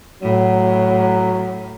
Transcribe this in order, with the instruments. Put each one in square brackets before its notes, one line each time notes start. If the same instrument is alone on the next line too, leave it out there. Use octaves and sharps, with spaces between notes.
[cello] A2 [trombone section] F#3